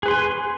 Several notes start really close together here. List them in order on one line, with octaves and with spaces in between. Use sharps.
G#4 B4 C6 G#5